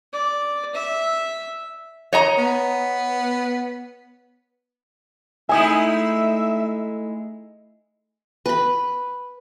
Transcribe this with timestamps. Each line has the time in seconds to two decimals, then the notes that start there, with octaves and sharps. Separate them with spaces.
0.13 D5
0.75 E5
2.13 C#5 D#5 A#5
2.38 B3
5.49 G#3 A3 D#4 E4 E5 G#5 D#6
8.46 B4 B5